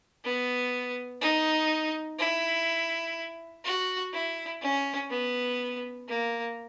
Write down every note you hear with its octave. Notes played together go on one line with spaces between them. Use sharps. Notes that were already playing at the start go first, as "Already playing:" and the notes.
B3
D#4
E4
F#4
E4
C#4
B3
A#3